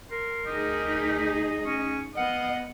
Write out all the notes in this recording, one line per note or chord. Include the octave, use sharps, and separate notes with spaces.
A#4 C6
D2 D#4 G4 G#4 D#5
C#4 C#6
B3 D#5 F5 F#5